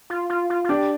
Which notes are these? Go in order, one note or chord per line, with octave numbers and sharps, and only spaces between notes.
F4
F4
F4
F4
D4 G4 D5